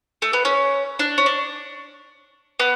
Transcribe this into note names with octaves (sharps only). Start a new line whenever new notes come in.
A3
B3
C#4
D4
C#4
D4
B3